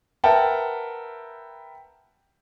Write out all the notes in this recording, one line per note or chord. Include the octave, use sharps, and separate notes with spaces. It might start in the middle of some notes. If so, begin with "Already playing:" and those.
A#4 B4 E5 F#5 G5 A5